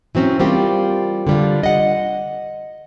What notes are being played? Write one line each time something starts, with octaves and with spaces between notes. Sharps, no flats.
E3 F#3 C4 C#4
G3 A#3 C4 F4 G4
D3 G3 F4
D#5 F#5